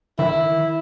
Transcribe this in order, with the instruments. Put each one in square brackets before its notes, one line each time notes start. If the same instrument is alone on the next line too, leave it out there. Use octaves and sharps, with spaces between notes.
[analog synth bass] D#3 [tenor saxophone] E4